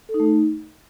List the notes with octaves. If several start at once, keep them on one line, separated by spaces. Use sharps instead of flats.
A4
D#4
A3
D#4